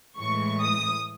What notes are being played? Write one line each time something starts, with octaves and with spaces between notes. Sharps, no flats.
A2 E3 G#3 C#6
D#6